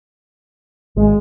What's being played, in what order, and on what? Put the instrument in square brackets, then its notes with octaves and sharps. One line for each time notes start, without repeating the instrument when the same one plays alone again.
[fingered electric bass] G#1 [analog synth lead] G#3